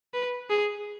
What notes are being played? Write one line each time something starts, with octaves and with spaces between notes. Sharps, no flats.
B4
G#4